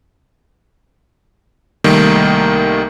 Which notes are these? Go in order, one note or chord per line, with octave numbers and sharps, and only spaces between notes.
C2 D#3 G3 A3 A#3